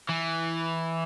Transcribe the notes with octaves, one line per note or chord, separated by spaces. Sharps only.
E3